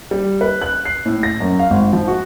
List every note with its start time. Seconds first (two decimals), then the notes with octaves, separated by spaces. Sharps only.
0.11 G3
0.41 B4
0.62 F#6
0.85 C7
1.06 A2
1.23 A#6
1.40 F#2
1.59 F5
1.70 G#1
1.93 F3
2.08 F#4